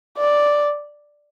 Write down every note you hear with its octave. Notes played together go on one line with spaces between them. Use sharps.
D5